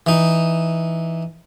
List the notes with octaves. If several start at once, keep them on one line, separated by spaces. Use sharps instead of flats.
E3 D#4